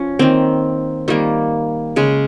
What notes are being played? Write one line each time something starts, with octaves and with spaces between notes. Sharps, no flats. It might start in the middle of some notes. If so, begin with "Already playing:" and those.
Already playing: F3 C#4
D#3 A#3 C4
D#3 G3 A#3
C#3 G#3